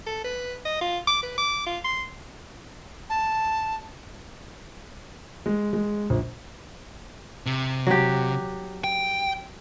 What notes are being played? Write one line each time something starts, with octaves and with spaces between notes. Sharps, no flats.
A4
B4
D#5
F4
D6
B4
D6
F4
C6
A5
G#3
G#3
A#1
C3
F#3 G4
G5